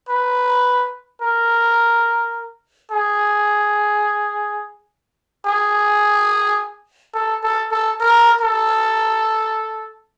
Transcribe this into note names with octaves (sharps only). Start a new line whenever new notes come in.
B4
A#4
G#4
G#4
A4
A4
A4
A#4
A4